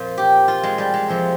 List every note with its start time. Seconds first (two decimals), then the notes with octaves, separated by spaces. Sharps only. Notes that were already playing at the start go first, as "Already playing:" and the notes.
Already playing: F2 A#2 F3
0.18 G4
0.48 F4
0.63 G#3
0.78 G3
0.94 G#3
1.08 F2 C3 F3